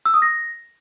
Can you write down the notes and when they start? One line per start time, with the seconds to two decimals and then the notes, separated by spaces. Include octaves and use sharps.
0.06 E6
0.14 D#6
0.22 A#6